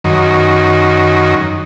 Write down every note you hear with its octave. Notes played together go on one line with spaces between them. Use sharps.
F#2 D#3